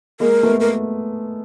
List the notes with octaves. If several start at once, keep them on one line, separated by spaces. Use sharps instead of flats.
G#3 A#3 A#4
A3 B3
A#4